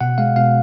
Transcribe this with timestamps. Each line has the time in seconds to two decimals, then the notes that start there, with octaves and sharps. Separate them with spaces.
0.01 B2 F#5
0.18 G#3 F5
0.36 B2 F5